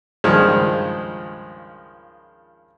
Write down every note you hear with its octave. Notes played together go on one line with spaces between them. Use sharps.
C#2 G2 D#3 F3 G#3